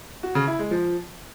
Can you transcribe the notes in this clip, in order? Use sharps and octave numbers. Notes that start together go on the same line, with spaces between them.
F#4
C#3
E4
G#3
F3